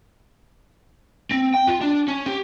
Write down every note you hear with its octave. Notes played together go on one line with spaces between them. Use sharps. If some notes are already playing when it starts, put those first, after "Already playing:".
C4
G5
F4
D4
C#4
G4